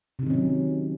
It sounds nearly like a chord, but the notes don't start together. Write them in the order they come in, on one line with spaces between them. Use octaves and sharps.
C3 D#4 D#3 C#4 F#3